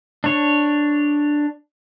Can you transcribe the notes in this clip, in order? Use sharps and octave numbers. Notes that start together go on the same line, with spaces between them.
D4 C#5